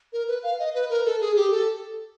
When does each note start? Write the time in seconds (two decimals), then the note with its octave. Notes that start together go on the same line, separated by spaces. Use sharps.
0.13 A#4
0.28 B4
0.43 F5
0.59 D#5
0.75 B4
0.90 A#4
1.05 A4
1.21 G#4
1.36 G4
1.51 A4